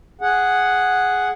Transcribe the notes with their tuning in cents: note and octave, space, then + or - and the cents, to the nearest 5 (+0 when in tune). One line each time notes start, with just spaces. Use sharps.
G#4 +0 F#5 +0